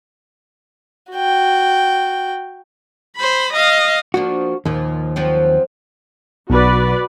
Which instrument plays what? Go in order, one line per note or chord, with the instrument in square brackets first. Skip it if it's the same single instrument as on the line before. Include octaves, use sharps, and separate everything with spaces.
[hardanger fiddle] F#4 G5
[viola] C5 B5
D#5 F5
[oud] F3 A#3 D4 [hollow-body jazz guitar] F#4
[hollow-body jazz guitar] D#2 [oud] A#2 F3
[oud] F3 F#3 C4
[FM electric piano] B1 [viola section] F#4 B4 D5